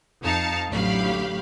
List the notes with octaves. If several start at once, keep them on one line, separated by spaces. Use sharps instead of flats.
F2 D#4 F5 A5 C#7
A1 D2 F#3 G4 F5 B5